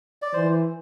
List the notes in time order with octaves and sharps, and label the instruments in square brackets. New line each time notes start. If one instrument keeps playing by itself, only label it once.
[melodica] D5
[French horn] E3 [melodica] C5